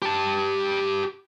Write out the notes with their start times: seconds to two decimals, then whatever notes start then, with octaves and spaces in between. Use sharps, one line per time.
0.02 G4 A5